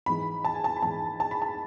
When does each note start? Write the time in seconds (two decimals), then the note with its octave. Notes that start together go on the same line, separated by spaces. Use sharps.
0.06 G#2 E3 B5
0.45 A5
0.54 G#5
0.64 A5
0.77 B5
0.82 G#2 E3 A5
1.20 A5
1.31 B5
1.42 A5